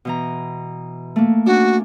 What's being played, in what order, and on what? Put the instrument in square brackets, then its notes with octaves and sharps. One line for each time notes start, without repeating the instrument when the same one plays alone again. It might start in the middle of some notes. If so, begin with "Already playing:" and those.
[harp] B2 E3 A#5
A3 A#3
[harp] C#4 D4 [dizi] F#4